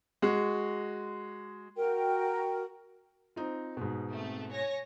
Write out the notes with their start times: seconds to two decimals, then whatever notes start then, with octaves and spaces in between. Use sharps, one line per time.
0.22 G#3 F#4
1.76 F#4 A#4 G5
3.36 C4 D#4 F4
3.77 G#2 B2
4.11 A3 C4
4.51 C#5 G#5 A#6